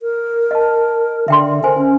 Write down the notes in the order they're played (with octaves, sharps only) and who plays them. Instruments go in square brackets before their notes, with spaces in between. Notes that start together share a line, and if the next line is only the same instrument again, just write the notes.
[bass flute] A#4
[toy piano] D#5 A5
[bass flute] D3 [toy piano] E5 G5 C6
[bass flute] A#4 [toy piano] C5 G#5
[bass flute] C#4